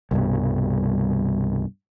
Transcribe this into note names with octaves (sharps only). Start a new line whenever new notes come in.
C2 G2 B2